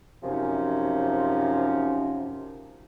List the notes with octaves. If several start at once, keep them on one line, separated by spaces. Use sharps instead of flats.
F#2 C3 F3 C#4 D#4